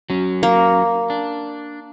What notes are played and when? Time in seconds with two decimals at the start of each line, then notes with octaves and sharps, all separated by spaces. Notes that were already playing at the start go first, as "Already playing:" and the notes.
0.10 F#3 C#4
0.43 A#3
1.10 D4